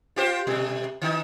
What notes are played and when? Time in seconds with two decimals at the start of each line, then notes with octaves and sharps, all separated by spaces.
0.16 F4 G4 C5
0.47 B2 G3 A3
1.02 D#3 D#4